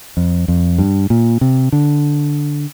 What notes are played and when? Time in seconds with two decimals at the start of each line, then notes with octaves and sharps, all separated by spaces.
0.17 F2
0.48 F2
0.78 G2
1.10 A#2
1.41 C3
1.72 D3